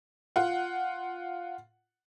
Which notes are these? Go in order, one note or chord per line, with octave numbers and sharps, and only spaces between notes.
F4 F#5